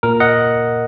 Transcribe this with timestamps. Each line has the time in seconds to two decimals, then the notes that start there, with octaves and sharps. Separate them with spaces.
0.03 A#2 A#4
0.20 D#5 F#5